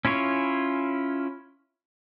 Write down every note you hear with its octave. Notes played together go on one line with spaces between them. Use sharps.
C#4 E4 F4 C#5